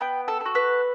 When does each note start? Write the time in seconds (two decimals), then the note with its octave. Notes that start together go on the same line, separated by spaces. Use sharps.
0.01 B3 G5
0.28 A4
0.41 F#4 A4
0.55 B4